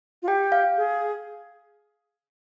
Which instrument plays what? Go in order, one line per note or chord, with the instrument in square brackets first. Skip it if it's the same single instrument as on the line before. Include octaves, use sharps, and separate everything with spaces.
[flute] F4
[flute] G4 [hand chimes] G5
[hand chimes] F5
[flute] G#4